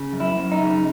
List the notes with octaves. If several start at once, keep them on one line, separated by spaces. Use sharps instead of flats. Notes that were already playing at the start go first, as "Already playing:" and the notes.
Already playing: C#3
F#2
E4
F#2
D#4
C#3